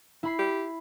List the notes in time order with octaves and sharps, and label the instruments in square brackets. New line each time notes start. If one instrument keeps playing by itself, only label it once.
[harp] E4 B5 C7
[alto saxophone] G4